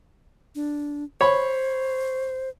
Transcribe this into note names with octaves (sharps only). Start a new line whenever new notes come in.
D4
C5 C#5 B5